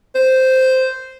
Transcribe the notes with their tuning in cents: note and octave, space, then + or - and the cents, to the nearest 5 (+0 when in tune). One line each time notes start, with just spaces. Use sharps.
C5 -5